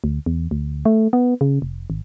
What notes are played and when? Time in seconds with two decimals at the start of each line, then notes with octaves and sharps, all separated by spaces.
0.04 D2
0.26 E2
0.51 D2
0.85 A3
1.13 B3
1.41 C#3
1.62 F1
1.90 G#1